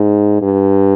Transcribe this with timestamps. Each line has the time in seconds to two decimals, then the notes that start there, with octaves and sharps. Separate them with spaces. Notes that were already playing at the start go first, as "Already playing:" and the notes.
Already playing: G#2
0.42 G2